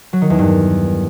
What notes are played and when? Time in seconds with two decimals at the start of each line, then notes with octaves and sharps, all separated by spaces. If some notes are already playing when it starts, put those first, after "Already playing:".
0.13 F#3
0.21 D#3
0.30 E2
0.39 G2